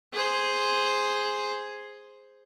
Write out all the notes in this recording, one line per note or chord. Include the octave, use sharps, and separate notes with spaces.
G#4 C5